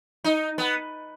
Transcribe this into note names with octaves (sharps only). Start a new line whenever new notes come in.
D#4
B3